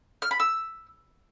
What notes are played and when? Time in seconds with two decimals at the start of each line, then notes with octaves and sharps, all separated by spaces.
0.22 F6
0.31 B5
0.40 E6